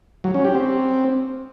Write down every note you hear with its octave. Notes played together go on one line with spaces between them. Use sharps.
F#3
C#4
G4
C4